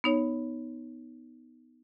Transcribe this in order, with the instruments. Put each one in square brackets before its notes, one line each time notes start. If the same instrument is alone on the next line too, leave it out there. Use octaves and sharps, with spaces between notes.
[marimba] B3 D#4 C#5